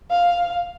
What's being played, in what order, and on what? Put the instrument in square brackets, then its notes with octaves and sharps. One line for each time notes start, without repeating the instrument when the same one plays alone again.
[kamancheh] F5